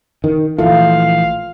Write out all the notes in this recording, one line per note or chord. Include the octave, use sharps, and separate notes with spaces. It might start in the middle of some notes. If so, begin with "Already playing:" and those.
D#3
A#1 E3 A3 F4 F5